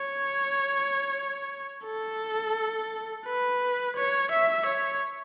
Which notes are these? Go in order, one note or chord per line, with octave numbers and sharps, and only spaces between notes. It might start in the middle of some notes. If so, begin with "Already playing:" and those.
Already playing: C#5
A4
B4
C#5
E5
C#5